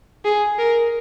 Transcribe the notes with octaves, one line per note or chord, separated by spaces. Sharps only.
G#4
A#4